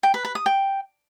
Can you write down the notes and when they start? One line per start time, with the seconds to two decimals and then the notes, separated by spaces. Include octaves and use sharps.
0.03 G5
0.14 B4
0.25 B4
0.35 D#6
0.46 G5